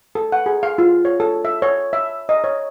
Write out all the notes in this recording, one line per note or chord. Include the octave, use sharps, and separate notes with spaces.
A4
F#5
G#4
F5
F4
C#5
A4
E5
C#5
E5
D#5
C#5